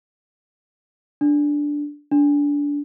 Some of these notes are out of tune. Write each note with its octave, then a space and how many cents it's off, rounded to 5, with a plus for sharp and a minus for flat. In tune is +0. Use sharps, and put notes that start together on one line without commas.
D4 -5
D4 -25